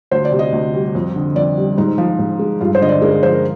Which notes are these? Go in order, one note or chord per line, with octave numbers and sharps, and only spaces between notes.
D2 C5
D5
C3
D#5
D2
G3
F2
D3
F2 D5
G3
G#2 D#4
F3
G#2
G#3
G2 F4
C5
D3 D#5
D5
G#3 A#4
A#4
F3 C5
A#4